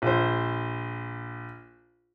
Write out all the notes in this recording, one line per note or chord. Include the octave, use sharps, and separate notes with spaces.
A#1 C5